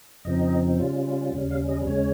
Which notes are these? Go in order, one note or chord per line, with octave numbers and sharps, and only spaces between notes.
F2 C#3 F3 C4 D#4 D#5
C#3 G3 C#4 F4
D#2 C#3 G3 C#4
F5
D#5
D#2 C#3 G#3 C#4 C#5